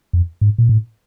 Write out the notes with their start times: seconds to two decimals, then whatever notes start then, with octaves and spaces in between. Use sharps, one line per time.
0.13 F2
0.41 G#2
0.58 A#2
0.69 A2